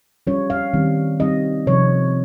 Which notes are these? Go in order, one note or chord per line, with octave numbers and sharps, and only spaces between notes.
G3 C#4 F4 C#5
F5
D#3 G3 C4
G3 C4 D#4 D#5
C3 F3 C4 C#5